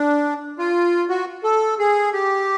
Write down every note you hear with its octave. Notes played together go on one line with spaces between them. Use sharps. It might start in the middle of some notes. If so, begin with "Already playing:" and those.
Already playing: D4
F4
F#4
A4
G#4
G4